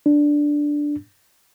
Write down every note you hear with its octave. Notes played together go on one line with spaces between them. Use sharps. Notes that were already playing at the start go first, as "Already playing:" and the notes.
D4